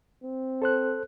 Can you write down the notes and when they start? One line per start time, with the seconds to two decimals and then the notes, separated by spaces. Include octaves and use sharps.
0.24 C4
0.62 A4 C5 F#6